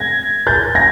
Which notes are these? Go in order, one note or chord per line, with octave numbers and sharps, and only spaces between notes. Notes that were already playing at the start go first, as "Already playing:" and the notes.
Already playing: G#6 A#6
G6 A6
G#6 A#6